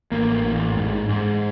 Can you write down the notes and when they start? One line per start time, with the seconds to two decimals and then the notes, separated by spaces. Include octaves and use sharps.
0.12 A1 A#3
0.44 A1
0.77 G#2
1.09 G#2